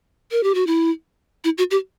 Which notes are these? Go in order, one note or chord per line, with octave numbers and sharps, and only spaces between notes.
A#4
G4
F#4
E4
E4
F#4
G4